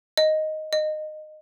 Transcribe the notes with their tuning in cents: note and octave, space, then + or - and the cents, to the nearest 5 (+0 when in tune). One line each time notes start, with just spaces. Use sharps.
D#5 +0
D#5 -20